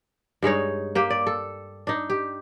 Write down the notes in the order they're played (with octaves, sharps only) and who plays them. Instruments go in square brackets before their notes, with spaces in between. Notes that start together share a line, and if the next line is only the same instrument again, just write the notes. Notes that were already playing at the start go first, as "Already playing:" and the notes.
[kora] G2 G#3 D#4 C#5
A#3 G4
D5
A4
D4 D#4
G4